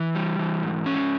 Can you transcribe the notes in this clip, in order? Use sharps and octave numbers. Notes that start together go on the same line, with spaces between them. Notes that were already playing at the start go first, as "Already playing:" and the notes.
Already playing: E3
G3
E3
G#2
C#4